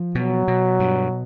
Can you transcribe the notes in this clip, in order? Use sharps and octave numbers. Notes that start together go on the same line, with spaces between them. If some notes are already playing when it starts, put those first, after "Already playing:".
Already playing: F3
B2 F#3
B2
G2